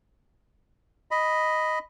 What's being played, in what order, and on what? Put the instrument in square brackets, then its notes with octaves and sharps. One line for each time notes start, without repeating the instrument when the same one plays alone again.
[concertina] D#5 B5